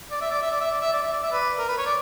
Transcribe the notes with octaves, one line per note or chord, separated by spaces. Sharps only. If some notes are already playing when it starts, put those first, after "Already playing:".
D5
E5
D5
E5
D5
E5
D5
E5
D5
E5
D5
E5
B4 D5
A#4
B4
C#5
D5